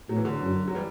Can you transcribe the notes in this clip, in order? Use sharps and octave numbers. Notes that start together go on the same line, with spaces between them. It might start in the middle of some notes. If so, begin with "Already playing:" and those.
A2 F#3
E3
D3 F#3
F#2
F#3
E3 G3